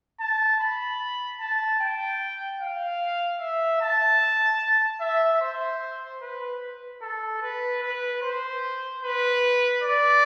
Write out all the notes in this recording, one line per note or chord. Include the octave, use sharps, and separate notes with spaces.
A5
B5
A5
G5
F5
E5
A5
E5
C5
B4
A4
B4
B4
C5
B4
D5